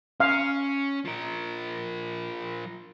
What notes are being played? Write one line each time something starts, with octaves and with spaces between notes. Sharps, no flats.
C#4 F5
F3 A#4